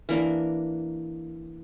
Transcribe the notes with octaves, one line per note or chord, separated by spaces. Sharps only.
E3 A#3 D4 A#4